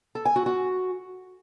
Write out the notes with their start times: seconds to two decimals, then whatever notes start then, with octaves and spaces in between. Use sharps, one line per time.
0.15 A4
0.25 G#5
0.36 F#4
0.46 F#4